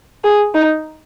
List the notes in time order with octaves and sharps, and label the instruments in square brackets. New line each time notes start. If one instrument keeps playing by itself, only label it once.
[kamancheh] G#4
D#4